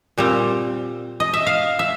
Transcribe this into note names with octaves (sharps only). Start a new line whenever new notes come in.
A#2 G3 C4
D#5
E5
F5
E5